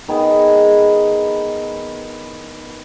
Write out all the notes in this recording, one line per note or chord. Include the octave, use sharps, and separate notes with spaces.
D#3 B3 G#4